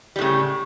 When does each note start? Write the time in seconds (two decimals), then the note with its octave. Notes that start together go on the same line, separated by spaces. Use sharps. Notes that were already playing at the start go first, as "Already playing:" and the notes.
0.16 G3
0.19 A2
0.22 C#3